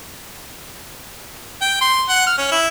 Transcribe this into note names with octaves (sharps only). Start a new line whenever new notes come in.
G5
C6
F#5
F6
C#4
E4